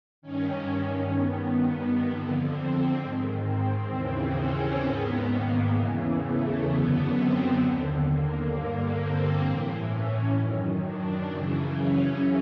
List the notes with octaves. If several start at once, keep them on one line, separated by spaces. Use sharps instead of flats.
G2 D#3 C#4
G2 D#3 B3
F2 D3
C4
G#2 D#3
C4
D#2 C#3 E3 C4
C#4
G#2 D#3 B3
A#3
E2 C#3 E3
A3
F#2 D3 B3
C4
D#2 D3
A#3
G2 D3 A#3
C4
A2 E3
C#4
F#2 D#3
D4
F#2 C#3 E3
C#4